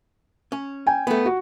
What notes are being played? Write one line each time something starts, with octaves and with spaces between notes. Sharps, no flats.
C#4
G5 G#5
A3 B3
F#4